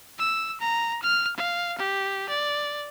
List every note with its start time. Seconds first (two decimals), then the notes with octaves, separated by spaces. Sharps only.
0.18 E6
0.60 A#5
1.02 F6
1.36 F5
1.78 G4
2.29 D5